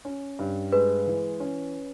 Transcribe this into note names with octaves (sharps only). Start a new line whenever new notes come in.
C#4
G2
G#3 B4
E3
C#4